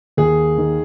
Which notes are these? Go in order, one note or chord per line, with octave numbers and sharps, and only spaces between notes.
D#2 G#4
D#3